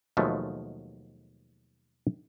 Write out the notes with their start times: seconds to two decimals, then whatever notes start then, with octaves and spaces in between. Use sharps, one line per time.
0.17 D#2 B2 F3 F#3 G#3 A3